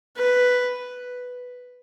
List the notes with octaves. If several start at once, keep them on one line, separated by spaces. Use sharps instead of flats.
B4